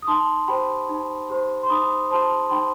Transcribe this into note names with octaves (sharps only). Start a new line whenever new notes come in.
D#6
D#4 A5 C6
G4 C5 G5 B5
D#4
G4 C5
C6
D#4 B5 D#6
G4 C5 A5 C6
C6
D#4 G5 B5